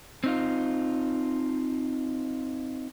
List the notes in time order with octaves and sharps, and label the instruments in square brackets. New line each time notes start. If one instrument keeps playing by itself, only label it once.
[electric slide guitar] C4 D#4 F4